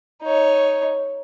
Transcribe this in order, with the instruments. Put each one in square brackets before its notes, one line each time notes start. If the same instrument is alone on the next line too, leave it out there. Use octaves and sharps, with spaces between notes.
[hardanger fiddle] D#4 C#5